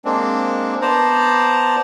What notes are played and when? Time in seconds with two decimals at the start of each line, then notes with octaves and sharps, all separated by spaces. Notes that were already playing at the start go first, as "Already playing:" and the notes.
0.05 G#3 A#3 C4 D4
0.81 B3 C5 D5 A5 A#5